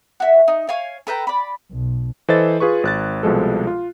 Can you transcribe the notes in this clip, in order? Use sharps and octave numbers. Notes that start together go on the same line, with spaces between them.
F#4 E5
D#4
C#5 F5 G#5
A4 B4 G5 A#5
D5 B5
B1
E3 A4 C5 D#5 A6
F4 G#4 B4 C#6
G#1 F#6 A6
C2 B2 F3 G#3 A4
F4